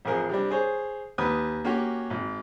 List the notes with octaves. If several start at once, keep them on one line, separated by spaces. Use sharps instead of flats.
A1 F2 G#4 A#4
C3 G3 D4
G#4 C5 C#5
D#2 B4 D#6
A#3 C#4 F#4 G4 C#5
G#1